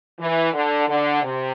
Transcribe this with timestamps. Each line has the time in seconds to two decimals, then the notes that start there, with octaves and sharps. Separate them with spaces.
0.19 E3
0.53 D3
0.88 D3
1.22 C3